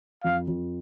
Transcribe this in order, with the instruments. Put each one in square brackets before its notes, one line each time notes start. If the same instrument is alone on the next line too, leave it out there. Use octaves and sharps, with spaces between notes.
[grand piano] F2 [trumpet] F5
[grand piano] F2